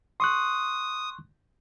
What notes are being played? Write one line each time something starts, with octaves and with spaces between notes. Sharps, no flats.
C6 C#6 D#6 F#6